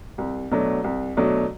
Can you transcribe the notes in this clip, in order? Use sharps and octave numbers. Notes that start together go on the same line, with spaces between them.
C2
B2 F#3 A3 D4
C2
B2 F#3 A3 D4